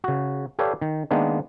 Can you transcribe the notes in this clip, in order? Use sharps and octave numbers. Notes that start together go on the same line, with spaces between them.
C#3 F#4
G4 A4 B4 C#5 D5 F5
D#3
D#3 G#3 A#3 B3 D4